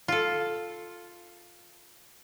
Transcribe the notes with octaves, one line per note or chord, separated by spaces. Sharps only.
F4 A4